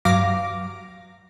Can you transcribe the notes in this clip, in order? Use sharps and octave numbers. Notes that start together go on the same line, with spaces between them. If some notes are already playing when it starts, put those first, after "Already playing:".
G2 F#3 F5 D6 A#6